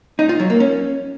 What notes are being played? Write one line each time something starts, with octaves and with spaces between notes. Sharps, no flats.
D#4
F4
F#3
A#3
C#4